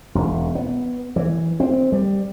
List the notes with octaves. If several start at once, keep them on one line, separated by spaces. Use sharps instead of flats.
E1
B3
E3
C4
G3